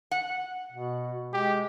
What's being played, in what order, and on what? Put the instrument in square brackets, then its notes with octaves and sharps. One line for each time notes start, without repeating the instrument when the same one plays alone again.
[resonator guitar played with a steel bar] F#5
[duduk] B2
[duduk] G#3 [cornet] G4